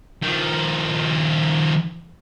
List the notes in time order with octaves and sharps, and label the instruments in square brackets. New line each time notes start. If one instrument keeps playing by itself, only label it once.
[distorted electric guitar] D#3 F3